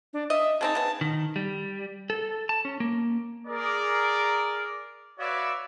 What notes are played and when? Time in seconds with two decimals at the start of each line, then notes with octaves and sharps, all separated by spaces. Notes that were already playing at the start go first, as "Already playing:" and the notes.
0.13 D4
0.30 D#5 E5
0.61 C#3 C4 D#4 A5
0.75 C#3 B3
1.01 D#3
1.36 G3
2.10 A4
2.49 A5
2.65 C#4
2.80 A#3
3.47 G#4 A#4 D5
5.19 F#4 B4 C#5 D5 E5 F5